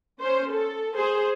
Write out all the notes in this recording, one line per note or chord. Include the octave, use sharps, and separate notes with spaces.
C#4 C5
A4
G#4 C5